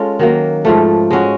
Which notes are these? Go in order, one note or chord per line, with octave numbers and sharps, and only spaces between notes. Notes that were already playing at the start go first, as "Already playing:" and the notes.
Already playing: G#3 C#4 F4 A4
D#3 F#3 A#3
G#2 F3 A3
G#3 C#4 F#4